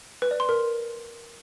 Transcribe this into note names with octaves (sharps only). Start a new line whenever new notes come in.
B4
D5
C6
A#4